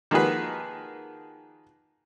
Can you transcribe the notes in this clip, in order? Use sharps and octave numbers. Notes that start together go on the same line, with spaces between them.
D#3 F3 A#3 F#4 G#4 B4